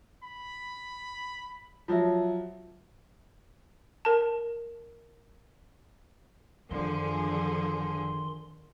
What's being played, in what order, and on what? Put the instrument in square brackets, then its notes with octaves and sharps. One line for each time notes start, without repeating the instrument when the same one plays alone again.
[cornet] B5
[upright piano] F3 F#3 [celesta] F4 E5
[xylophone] A#4 A5
[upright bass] F#2 [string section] D3 F3 G#4 [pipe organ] D#3 C6